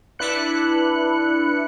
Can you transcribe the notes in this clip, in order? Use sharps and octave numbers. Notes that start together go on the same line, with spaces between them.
D4 E4 B4 F#6 C#7